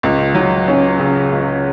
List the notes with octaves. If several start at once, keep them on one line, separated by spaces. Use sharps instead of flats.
C#2
F#3
C#4
C#3
C#2